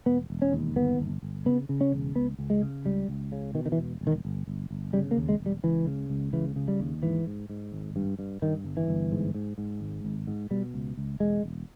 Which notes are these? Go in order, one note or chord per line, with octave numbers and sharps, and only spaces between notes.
E1 B3
E1
C#4
D#2
G1 B3
G1
G1
C#3 B3
C#3
C#4
E1
C#2 B3
C#2
G#3
C#3
C#2 G3
C#2
C#3
B2 D#3
D#3
E3
E1
E1
D#3
G1
G1
G1
C#3 G3
A#3
D#2
G#3
E1
G3
C#2 E3
C#3
C#2
C#3 E3
C#3
G3
D#2
G#2 E3
G#2
G#2
G#1
G2
G2
G2 D#3
G1
E3
G1
G#2
G#2
G#2
G#1
G#1
G#2
B2 G3
C#2
C#2
E1 G#3
E1